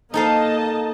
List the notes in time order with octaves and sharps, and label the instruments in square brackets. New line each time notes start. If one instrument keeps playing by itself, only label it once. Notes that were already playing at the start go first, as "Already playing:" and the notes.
[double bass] A#3 [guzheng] D#4 A4 F5 [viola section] D#5 A5